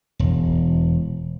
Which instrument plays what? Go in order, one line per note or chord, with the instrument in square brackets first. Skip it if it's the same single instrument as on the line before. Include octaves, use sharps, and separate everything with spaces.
[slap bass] E1